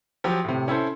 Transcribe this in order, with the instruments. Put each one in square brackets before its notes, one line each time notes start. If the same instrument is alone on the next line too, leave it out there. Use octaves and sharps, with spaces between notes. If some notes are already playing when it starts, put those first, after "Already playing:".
[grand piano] F3 F#3 G4
A2 C3
C#4 E4 A4 C5